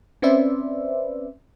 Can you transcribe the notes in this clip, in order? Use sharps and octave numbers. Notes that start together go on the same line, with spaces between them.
C4 C#4 B4 C5 D5 E5